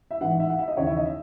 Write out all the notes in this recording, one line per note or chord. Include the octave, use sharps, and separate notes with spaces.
E5
A1 G#2 E3 F#5
E5
F#5
E5
D#5
D#2 C#3 E3 C#5
E5
D#5
E5